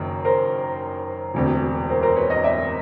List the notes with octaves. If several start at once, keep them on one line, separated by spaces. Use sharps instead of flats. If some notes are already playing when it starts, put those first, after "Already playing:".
Already playing: F#1 F#2 D#3
A#4 C5
E1 D2 C3
A#4 C5
A#4 C5
B4 C#5
C#5 D#5
D5 E5